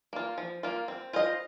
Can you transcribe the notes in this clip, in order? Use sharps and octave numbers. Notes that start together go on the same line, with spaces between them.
A#3 F4
F3
A#3 F4
C4
F4 C5 D#5